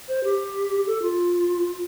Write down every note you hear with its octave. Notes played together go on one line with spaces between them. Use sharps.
C5
G4
A4
F4